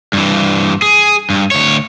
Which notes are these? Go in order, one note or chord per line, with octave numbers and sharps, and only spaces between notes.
G2 E3
G#4
G2
D2 C#5